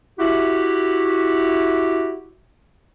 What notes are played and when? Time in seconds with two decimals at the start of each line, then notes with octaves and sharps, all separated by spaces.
0.18 E4 F#4 G4